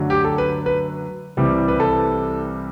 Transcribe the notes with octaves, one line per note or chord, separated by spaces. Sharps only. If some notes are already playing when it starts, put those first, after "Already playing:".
Already playing: F#2 D3 F#3 A3
G4
A4
B4
B4
C2 C3 E3 G3
B4
A4